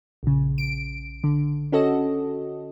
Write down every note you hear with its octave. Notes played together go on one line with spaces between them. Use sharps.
A#1 C#3
D7
D3
C#4 F#4 A4 D#5